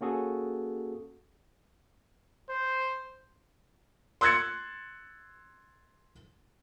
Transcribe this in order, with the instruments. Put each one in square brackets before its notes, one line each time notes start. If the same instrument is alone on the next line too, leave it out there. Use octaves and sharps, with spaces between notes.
[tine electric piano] A#3 C#4 F#4 G#4 A4
[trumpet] C5
[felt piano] C6 E6 F#6 G#6 A6 C#7